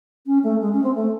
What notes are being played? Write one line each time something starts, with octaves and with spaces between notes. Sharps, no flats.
C#4
A3
G#3
C#4
C4
A3